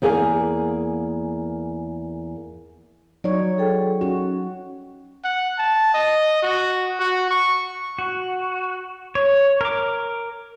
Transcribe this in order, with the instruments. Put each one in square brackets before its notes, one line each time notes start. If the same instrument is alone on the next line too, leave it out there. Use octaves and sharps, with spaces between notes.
[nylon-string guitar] E2 A#3 G#4 F5 G#5
[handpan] F#3 D#4 C#5 [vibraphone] D5
[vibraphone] G#4 A4 G5
[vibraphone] C#4 [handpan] F#4
[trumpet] F#5
A5
D#5
F#4
F#4
C#6
[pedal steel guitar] F#4
C#5
A#4 D6